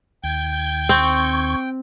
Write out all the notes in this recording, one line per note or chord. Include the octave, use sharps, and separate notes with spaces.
D#2 G5 G6 G#6
C4 C#6